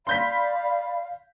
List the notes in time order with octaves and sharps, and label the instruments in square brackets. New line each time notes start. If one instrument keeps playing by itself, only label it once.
[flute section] D5 B5 [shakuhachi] F5 [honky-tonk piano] C6 G6 B6